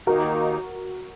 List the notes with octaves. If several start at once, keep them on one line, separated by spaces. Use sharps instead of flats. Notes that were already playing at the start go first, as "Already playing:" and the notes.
D#2 D#3 A#3 D#4 F#4 A#4